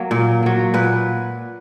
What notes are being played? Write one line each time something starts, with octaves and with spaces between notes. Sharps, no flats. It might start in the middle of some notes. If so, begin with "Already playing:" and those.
Already playing: F#3 A#3
A#2
F#3 A#3
A#2 B4